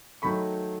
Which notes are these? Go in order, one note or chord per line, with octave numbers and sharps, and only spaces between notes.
D#3 F#3 A3 B5 C#6